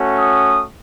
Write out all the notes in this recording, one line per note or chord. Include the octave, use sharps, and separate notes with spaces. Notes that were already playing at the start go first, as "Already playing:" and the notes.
Already playing: A3 C#4 F#4
D#6